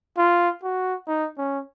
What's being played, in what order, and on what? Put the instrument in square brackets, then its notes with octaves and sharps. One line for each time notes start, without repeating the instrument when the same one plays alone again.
[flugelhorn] F4
F#4
D#4
C#4